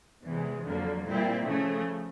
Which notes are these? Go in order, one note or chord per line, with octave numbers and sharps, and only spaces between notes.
E2 C3 E3 G#3
F2 D3 F#3 A#3
A#2 G3 C4 E4
C#3 F3 A3